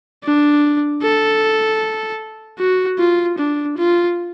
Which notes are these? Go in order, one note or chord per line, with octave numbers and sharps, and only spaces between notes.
D4
A4
F#4
F4
D4
F4